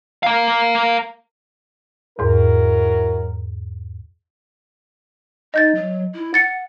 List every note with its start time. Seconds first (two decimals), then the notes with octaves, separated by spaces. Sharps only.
0.23 A#4 F5
2.19 E2 G#2 F#3 E4 A#4
5.54 D#4 D#5 G6 A6
5.75 F#3
6.15 E4
6.34 F#5 A6 C#7